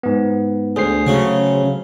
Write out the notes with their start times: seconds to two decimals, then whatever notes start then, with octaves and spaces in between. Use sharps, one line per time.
0.03 G#2 B3
0.76 D2 G#4 C5 C7
1.07 C#3 F#3 A3